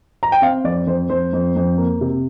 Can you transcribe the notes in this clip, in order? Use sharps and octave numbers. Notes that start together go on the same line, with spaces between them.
A#5
G5
C4 F5
F2 D5
F2 C5
F2 C5
F2
F2
A#3
C3